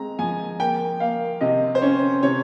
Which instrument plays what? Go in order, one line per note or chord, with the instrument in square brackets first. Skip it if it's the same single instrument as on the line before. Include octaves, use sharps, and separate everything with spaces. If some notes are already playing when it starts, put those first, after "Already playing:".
Already playing: [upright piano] G#3 C4 A#5
F3 G#5
A#3 G5
A#3 F5
C3 D#5
C5
C#4 C#5
C3 C#5